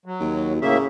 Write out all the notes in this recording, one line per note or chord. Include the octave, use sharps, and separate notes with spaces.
F#3
D#2
A2 C#3 A#3 E5